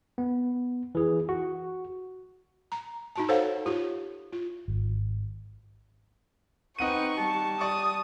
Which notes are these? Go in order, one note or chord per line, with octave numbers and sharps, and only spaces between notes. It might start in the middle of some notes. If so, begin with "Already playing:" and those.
B3
E3 G#4
F#4
A#5
D#4 F#4 A5
A4 C5 C#5 F5 F#5
F4 G4 C#5
F4
G#1
C4 D#4 B4 F#5 C#6 D#7
G3 A5
D5 C#6 D#6